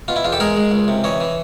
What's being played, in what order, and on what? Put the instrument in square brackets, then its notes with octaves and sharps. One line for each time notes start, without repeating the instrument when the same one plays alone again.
[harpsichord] B2 F4
E4
E2 F4
G4 A4
G#3 G#4 A#4
G#3
C#2
C3
E3 C#5 D#5
E3